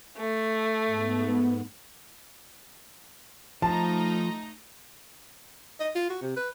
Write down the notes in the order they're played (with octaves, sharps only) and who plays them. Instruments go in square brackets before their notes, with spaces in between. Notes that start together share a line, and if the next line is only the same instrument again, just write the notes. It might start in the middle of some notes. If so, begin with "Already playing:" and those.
[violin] A3
[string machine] G#2 B3
[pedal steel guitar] F3 [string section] A3 D#4 A#5 [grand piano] A5
[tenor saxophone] D#5
F4
F#4
C3
B4